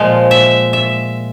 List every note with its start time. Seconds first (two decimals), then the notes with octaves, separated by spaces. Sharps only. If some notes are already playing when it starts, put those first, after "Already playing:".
Already playing: A#2 F3 G#3 F5
0.31 E5
0.73 E5